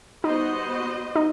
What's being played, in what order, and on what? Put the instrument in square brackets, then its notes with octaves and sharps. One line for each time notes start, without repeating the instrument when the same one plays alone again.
[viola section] G3 B3 F#4 C5 D#5 [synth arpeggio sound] D#4
[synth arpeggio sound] D#4